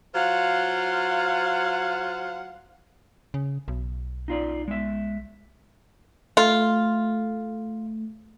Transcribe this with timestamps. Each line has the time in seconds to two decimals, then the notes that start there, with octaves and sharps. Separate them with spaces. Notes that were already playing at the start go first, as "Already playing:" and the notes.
0.14 F#3 F4 C5 F5 F#5
3.34 C#3
3.68 B1
4.28 D#4 F4 D5
4.68 G#3 E5
6.37 A3 F4